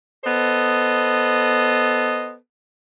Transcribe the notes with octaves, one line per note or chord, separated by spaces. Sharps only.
B3 A4 C5 D#5